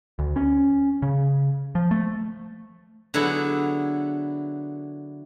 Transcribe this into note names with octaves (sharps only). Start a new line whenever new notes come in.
D2
C#4
C#3
F3
A3
D3 F#3 B3 E4 G#4